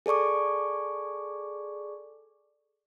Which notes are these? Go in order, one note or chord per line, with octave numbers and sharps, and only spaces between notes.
G#4 A4 D5 C#6 D6